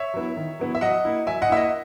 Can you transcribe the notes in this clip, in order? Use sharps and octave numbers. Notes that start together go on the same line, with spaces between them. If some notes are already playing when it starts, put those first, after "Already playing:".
Already playing: C#5 E5
F#3 B3 E4
D#3
F#3 B3 E4
E5
F#3 D#5 F#5
A#3 E4
F#3 E5 G#5
D#5 F#5
A#3 E4 E5
D#5 F#5